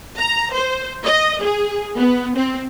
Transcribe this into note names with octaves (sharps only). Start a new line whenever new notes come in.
A#5
C5
D#5
G#4
B3
C4